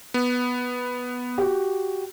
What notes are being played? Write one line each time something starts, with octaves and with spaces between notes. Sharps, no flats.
B3
F#4 G4